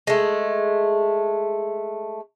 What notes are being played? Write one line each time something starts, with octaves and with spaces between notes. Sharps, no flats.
G#3 A3